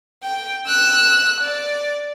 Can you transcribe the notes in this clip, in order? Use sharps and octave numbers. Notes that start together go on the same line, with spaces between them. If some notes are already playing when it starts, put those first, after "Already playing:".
G5
E6 F#6
D5